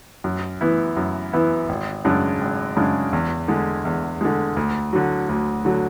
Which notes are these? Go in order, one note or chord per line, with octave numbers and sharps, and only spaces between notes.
F#2
E3 B3 E4
F#2
E3 B3 E4
G#1
F#2 C#3 G#3 D4
G#1
F#2 C#3 G#3 D4
E2
D3 G#3
E2
D3 G#3
D2
D3 F#3
D2
D3 F#3